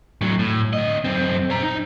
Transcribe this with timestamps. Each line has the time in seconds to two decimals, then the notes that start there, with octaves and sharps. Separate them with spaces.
0.21 A2 F#3
0.39 A2
0.73 D2 D#5
1.05 F#2 C4
1.50 C5 A#5
1.63 D#4